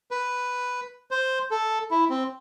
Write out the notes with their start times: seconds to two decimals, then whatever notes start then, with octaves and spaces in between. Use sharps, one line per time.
0.11 B4
1.11 C5
1.51 A4
1.91 E4
2.10 C4